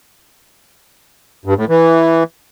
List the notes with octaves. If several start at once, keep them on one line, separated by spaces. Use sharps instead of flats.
G2
A2
E3